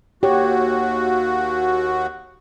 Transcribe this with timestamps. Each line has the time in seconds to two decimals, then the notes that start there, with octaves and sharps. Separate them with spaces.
0.23 D#2 F#4 G4 C#5